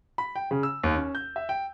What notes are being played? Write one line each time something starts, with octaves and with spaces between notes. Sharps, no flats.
B5
G5
C#3
E6
D#2
C#4
G6
E5
G5